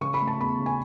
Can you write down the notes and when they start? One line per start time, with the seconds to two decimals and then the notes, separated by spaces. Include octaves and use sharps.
0.01 C#3 C#6
0.14 B5
0.21 A3
0.27 A5
0.40 E2 B5
0.59 C#3
0.66 G#5